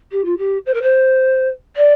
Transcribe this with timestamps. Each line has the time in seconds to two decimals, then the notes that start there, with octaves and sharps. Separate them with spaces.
0.12 G4
0.25 F4
0.38 G4
0.66 C5
0.74 A#4
0.82 C5
1.77 D5